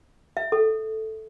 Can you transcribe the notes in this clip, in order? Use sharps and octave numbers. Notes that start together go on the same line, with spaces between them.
E5
A4